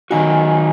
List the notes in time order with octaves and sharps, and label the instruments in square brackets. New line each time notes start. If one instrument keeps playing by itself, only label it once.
[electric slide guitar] D#3 F#3 D#4 F#4 [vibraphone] G#5